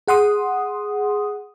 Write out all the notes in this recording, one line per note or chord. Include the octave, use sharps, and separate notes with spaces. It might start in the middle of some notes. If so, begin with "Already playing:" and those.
G#4 F#5 C6 D#6